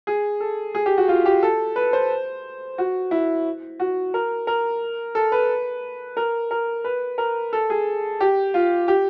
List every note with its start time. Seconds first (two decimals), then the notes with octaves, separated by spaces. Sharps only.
0.07 G#4
0.40 A4
0.75 G#4
0.86 G4
0.98 F#4
1.08 F4
1.26 G4
1.43 A4
1.76 B4
1.93 C5
2.78 F#4
3.11 E4
3.80 F#4
4.14 A#4
4.47 A#4
5.15 A4
5.32 B4
6.17 A#4
6.51 A#4
6.84 B4
7.18 A#4
7.53 A4
7.70 G#4
8.21 G4
8.54 F4
8.88 G4